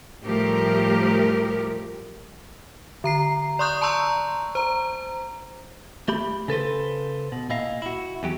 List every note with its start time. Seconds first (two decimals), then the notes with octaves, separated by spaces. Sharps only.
0.24 A2 F3 G3 A3 G4 A#4
3.04 D3 A#5 C7
3.59 D5 C6 C#6 D#6 F#6 G6
3.81 A5 A#5 C6 C#6 E6 G6
4.55 C5 A#5
6.08 A3 G4 B5
6.48 C#3 A4 B4 C5
7.32 B2
7.50 A#2 E4 D#5 F5
7.82 E4 F#4
8.23 E2 F#3 G4